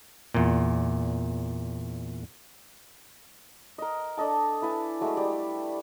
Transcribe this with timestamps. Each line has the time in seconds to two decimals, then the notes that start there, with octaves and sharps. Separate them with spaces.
0.34 E2 A#2
3.78 A#4 D#5
4.18 D4 A4 D#5 A5
4.62 E4 B4 G#5 A5
5.01 F#3 G#3 A3 E5
5.17 G3